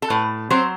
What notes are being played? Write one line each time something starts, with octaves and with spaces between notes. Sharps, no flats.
A4
A2 B4
F#3 C4 C5